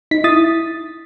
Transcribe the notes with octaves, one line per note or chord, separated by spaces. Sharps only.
D#4 B6
E4 D#6 A6